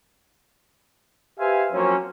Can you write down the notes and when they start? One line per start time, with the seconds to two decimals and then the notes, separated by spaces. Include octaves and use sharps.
1.39 G4 B4 C5 E5 F5 G#5
1.73 F3 F#3 A#3 C4 C#4